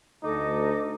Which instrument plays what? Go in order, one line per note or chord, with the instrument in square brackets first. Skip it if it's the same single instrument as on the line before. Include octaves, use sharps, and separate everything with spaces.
[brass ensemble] D2 [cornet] D#4 [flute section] A4 D#5 D6